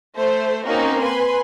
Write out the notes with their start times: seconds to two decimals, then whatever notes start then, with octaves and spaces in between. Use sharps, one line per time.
0.15 A3 C5
0.65 A#3 C4 C#4 D#4 F#4 A#4
1.01 B4 G#5 B5 C6